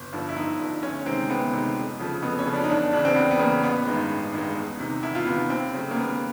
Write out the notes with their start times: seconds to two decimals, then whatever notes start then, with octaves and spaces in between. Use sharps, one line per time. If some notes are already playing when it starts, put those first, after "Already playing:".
Already playing: G1
0.13 G2 D3 F3
0.29 E4
0.36 G1 D#4
0.59 G2 D3 F3
0.82 D2 C#4
1.06 C3 D#3 G#3 C4
1.30 D2 B3
1.53 C3 D#3 G#3
1.76 F2
1.99 C#3 F3 A3
2.22 F2 B3
2.39 C#4
2.46 C#3 F3 A3
2.54 D4
2.64 D#4
2.70 E2 D4
2.93 C#3 E3 D4
3.05 C4
3.16 E2 B3
3.31 B3
3.39 C#3 E3 A#3
3.64 A1 B3
3.87 G2 D#3 G#3
4.10 A1
4.33 G2 D#3 G#3
4.57 E2
4.80 C3 D#3
5.03 E2 E4
5.15 F4
5.26 C3 B3
5.30 D#3
5.38 B3
5.50 D#2 C4
5.74 C#3 F#3 A3
5.91 A#3
5.96 D#2 B3